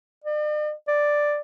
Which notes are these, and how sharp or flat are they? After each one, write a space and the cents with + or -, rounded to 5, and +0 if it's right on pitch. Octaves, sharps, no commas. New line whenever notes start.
D5 +45
D5 +5